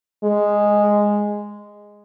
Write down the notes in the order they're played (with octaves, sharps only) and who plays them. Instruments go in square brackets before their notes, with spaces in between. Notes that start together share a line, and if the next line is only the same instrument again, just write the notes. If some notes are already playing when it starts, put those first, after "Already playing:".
[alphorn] G#3